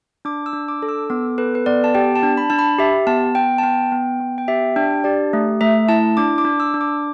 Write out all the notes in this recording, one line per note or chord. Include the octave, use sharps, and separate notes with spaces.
D4 D6
E6
D4
D6
A4
E6
B3 D6
A4 B4
B4
B3 D5
A5
G4 G5
A5
D4
B5
D4 A5
B5
G4 E5
B3 A5
B3 G5
A5
B3 G5
B3
B3
G5
G4 E5
D4 G5
G4 D5
A3
A3 E5
E4 A5
D4 D6
D6
D4
E6
D4
D6